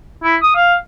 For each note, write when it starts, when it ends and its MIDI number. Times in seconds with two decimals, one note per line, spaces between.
0.24 0.36 64
0.43 0.56 87
0.56 0.75 77